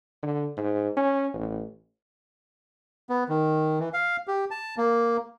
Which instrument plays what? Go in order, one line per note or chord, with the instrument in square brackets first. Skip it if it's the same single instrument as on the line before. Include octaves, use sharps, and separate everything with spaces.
[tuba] D3
G#2
C#4
A1
[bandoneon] B3
D#3
E3
F5
G4
A5
A#3